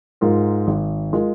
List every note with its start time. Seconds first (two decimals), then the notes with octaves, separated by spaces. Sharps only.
0.21 G#2 G#3 F4 A#4
0.67 G#1
1.13 G#3 F4 A#4